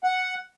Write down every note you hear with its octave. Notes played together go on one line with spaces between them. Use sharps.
F#5